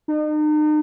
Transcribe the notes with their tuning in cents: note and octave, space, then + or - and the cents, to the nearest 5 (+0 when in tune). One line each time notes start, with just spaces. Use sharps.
D#4 -40